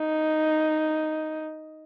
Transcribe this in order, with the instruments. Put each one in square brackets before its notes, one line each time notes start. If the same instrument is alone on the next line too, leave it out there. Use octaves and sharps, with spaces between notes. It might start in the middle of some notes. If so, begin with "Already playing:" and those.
Already playing: [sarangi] D#4